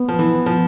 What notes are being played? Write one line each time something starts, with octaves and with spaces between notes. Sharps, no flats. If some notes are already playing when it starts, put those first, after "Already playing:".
Already playing: B3
F3
E3
F3